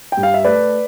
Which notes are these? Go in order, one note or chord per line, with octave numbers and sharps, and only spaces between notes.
G2 G5
F5
E5
A3 B4 D5